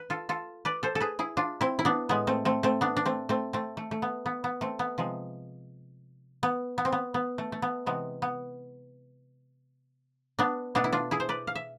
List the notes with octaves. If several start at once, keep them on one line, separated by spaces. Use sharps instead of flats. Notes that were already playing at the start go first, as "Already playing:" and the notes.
Already playing: B4
F4 A4
F4 A4
B4 D5
A4 C5
A4
G#4 B4
E4 G#4
D4 F4
C4 E4
E4
B3 D4
A2 G#3 B3
A3 C4
A3 C4
A3 C4
B3 D4
D4
A3 C4
A3 C4
A3 C4
A3
A3
B3
B3
B3
A3 C4
B3
C3 F3 G#3
B3
B3
C4
B3
B3
A3
A3
B3
C3 E3 G#3 B3
B3
B3 D4
B2 A3 B3 D4
E4
D4 F4
E4 G#4
C5
B4 D5
F5
E5